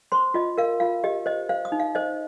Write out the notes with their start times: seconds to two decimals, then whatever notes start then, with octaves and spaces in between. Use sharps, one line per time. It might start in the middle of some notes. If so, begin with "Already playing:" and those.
0.12 C5 C6
0.34 F4 D#5
0.58 A#4 F5
0.80 F4 F5
1.04 G4 D#5
1.26 C5 D#5
1.49 C5 F5
1.65 D#6
1.72 D#4
1.80 F5
1.95 C5 D#5